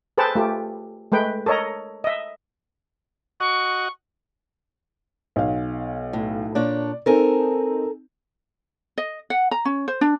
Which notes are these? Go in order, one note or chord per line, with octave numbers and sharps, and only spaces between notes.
G#4 A4 B4 C5 G5 A5
A3 F4 G4
G#3 A3 B4 G5
A4 A#4 C#5 D#5 A#5
D#5 E5
F#4 D#5 F#5 C#6
B1 F5
A2
A#2 D4 C#5 D5
C4 D#4 A4 A#4 G#5
D#5
F#5
A#5
C#4
C5
D4